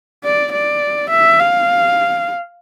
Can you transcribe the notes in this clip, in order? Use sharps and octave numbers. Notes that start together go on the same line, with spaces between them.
D5
D5
E5
F5